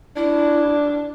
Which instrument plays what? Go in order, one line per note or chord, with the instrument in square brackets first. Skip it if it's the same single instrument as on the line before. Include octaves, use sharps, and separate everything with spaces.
[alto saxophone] D4 [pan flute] E4